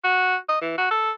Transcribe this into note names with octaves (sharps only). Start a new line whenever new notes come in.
F#4
D#5
E3
F#4
A4